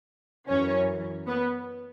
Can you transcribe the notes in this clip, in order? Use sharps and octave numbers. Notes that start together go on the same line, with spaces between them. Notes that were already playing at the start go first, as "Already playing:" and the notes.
F#2 E3 C#4 C#5
B3 B4